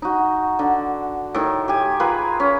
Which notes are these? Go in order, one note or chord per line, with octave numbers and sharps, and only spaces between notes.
D#4 F#4
D3
A2 D#3
G4 G#5
F4 G#4 A#4 B4
C#4